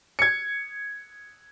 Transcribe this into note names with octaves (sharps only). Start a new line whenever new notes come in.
G#6 C#7